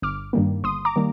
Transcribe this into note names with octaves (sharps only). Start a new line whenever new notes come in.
G1 D6 F6
G2 D#3 G3 A#3
G1 C6 D#6
A#5 D6
D#3 G3 A#3